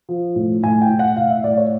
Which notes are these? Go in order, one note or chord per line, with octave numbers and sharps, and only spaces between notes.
F3
A2
A2 G#5
G5
A2
F#5
A2 F5
E5
A2 D5
C#5